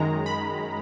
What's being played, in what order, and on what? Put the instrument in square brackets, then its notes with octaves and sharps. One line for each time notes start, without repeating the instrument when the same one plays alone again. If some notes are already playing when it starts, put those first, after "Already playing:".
Already playing: [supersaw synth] F#2 D#3 G#3 A#5
B5